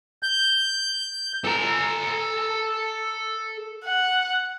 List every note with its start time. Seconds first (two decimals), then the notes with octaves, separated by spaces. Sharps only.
0.23 G6
1.45 A4 A#5
3.85 F#5